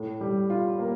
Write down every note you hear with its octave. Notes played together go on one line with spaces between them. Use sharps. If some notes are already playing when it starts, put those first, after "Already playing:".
Already playing: A2
G3
F4
A#3